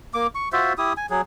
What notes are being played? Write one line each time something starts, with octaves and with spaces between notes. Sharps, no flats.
A#3 D6
C#6
F4 F#4 C5 E5
E4 G4 D#6
G#5
F#3 G#4